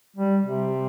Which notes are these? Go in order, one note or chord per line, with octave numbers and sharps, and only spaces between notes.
G3
C3